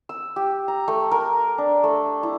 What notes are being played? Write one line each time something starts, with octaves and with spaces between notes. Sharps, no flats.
E6
G4
A#5
A3
A#4
D4
A3
E4